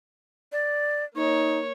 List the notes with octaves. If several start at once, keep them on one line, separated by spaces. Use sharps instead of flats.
D5
A#3 D#4 C#5